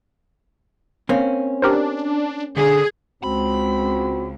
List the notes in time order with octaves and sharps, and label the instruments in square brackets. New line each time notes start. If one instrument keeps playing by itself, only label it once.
[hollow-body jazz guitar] A#3 C4 C#4
[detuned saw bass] D4 [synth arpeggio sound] G4 A#4 C5
[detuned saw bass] D3 [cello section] G#4
[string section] C#2 [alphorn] C4 [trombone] F#4 [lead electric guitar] B5